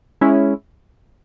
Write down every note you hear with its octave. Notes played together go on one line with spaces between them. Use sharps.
G#3 C#4 E4